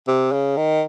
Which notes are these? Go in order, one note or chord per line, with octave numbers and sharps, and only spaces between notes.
C3
C#3
D#3